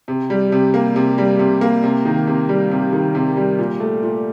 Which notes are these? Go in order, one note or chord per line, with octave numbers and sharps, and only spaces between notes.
C3
G3
C3
A#3
C3
G3
C3
A#3
C3
D#3
C3
G3
C3
D#3
C3
G3
A#2
A3
A#2